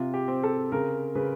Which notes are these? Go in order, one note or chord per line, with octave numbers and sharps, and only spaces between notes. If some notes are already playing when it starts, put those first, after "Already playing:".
Already playing: C3 F4
G4
C4
A4
C#3 A#4
C#3 B4